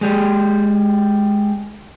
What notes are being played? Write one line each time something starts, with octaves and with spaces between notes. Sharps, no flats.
G#3 G4 G#4